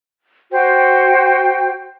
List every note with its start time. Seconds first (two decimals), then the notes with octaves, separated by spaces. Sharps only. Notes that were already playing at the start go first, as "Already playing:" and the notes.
0.52 F#4 C5 G5